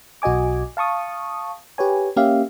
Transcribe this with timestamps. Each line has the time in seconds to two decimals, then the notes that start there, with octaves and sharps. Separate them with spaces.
0.22 B1 F#4 D#5 G#5 D6
0.77 F5 A5 C#6 D#6
1.78 G4 B4 C#5 G#5
2.16 A#3 C#4 G4 E5 F5